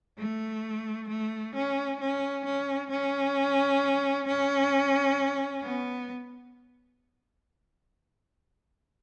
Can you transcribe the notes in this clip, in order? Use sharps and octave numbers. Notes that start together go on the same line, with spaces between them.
A3
A3
C#4
C#4
C#4
C#4
C#4
B3